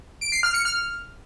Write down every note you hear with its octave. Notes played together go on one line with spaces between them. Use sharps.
D7
C7
F6
C#7
F6